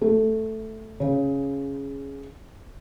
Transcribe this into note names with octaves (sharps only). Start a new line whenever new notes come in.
A3
C#3